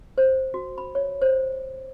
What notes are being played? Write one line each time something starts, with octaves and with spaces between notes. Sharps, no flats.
C5
F#4
B5
C#5
C5